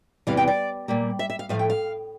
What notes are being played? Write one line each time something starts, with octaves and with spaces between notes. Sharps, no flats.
E2 C3 E3 G3 F5
G5
D5
A#2 G3 A#3
E5
E5
F5
A2 F3 A3 F5
G5
F5